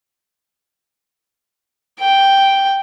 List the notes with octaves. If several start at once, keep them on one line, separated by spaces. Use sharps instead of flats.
G5